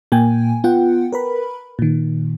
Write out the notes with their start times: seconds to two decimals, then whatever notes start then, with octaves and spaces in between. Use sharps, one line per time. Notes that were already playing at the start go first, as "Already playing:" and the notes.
0.12 A#2 A#3 G5 G#5
0.64 B3 F4 F#5 G5
1.13 A#4 B4 B5
1.79 A#2 D#3